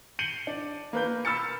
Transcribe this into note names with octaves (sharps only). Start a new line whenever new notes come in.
G6 C7 C#7 D#7 F#7 G7
D4
A#3 B4 G6
B5 E6 F6 A6 C#7